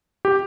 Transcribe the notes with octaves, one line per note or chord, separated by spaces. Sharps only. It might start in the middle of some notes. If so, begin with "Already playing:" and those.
G4